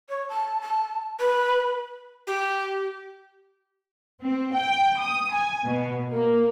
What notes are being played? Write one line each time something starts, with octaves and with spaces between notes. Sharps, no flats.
C#5
A5
A5
B4
G4
C4
G5
D#6
G#5
B2
A#3